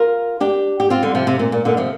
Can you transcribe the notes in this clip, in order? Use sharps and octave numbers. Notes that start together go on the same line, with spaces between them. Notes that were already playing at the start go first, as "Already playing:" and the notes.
Already playing: F4 A#4
D4 G4
G4
C4 F4
D3 G3
C3 F3
C3
A#2
A#2
A#2 D3
C3 F3